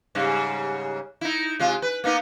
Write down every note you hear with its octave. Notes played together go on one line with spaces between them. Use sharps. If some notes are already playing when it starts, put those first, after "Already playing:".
G#2 C#3 G3
D#4 E4
C3 G#3 F4
B4
A#3 B3 D#4